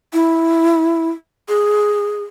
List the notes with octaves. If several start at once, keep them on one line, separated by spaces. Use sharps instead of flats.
E4
G#4